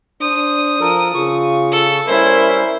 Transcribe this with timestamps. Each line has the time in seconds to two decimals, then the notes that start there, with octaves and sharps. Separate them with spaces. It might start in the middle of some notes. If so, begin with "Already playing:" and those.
0.21 D4 C5 D#6
0.80 F3 A4 A#4
1.14 C#3 F4 C#6
1.72 A4
2.08 G3 C#4 E4 A#4 C5